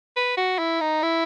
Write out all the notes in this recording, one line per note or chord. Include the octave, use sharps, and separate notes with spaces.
B4
F#4
E4
D#4
E4